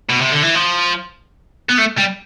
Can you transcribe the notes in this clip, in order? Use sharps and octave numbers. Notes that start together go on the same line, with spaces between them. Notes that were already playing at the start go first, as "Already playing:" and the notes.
B2
C3
D3
E3
F3
B3
A3
G3